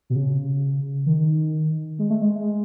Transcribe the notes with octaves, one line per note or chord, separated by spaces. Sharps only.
B2
C#3
D#3
G#3
A3
G#3